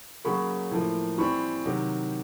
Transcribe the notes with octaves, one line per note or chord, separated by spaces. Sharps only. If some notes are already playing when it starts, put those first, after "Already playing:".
C#3 F#3 A#3 B5 C#6
A2 F3 A#3
E3 G3 C4 B5 C#6
C3 D#3 F#3